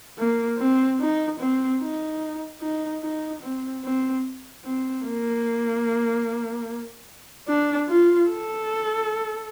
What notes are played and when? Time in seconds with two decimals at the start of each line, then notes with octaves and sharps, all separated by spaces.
0.18 A#3
0.58 C4
1.00 D#4
1.39 C4
1.81 D#4
2.61 D#4
3.03 D#4
3.42 C4
3.84 C4
4.64 C4
5.05 A#3
7.48 D4
7.88 F4
8.29 A4